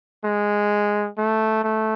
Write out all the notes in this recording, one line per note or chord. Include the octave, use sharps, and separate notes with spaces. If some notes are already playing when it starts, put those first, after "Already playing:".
G#3
A3
A3